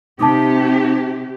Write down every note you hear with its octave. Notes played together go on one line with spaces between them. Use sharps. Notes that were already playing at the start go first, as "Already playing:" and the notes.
C3 D#4 G4 A5 D6 D#6